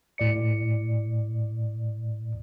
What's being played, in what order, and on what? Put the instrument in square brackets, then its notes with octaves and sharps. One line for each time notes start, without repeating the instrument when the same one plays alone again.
[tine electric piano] A2 D5 C#7